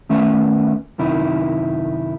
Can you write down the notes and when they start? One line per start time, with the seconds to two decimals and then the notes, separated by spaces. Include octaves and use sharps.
0.09 D#3 A3 B3 C#4 E5
0.98 F#2 C3 D#3 D#4 E4